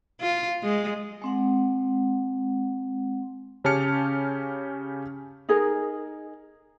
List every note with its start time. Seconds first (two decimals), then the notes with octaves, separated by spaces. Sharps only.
0.20 F4
0.63 G#3
1.22 G#3 C4 F#5
3.64 C#3 C#4 G4 A5 F6 C#7
5.49 D#4 G#4 A#4